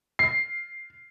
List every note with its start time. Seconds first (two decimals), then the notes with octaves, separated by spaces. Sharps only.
0.19 C7